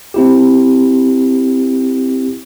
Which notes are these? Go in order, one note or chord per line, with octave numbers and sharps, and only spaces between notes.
C4 E4 G4